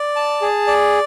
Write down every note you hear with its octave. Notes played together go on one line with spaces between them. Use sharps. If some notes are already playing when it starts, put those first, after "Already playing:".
Already playing: D5
A5
G#4
D5